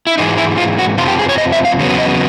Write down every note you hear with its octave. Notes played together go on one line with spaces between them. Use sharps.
E4
G#2 E3 G#3 D#4
E4
F4
F#4
F2 C3 F3 F4
G4
G#4
C#5
D#5
E5
F5
E2 C#3 F#3 B3
D#5